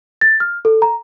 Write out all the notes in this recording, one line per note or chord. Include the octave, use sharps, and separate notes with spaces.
A6
F6
A4
A#5